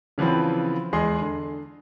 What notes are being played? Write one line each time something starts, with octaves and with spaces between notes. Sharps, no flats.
C#3 E3 F3 B3 C4
E2 G#3 G#4 D#5 C6
D3